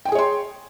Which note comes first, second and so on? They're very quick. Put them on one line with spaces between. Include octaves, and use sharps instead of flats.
G5 G#5 G#4 C#5 C6